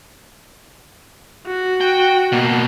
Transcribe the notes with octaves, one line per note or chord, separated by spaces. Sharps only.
F#4
G5
B2 A#3